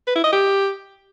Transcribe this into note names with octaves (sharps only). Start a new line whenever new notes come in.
B4
E4
D#5
G4